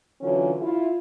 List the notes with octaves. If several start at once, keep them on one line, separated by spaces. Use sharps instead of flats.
D3 E3 F#3 C#4 F4
E4 F4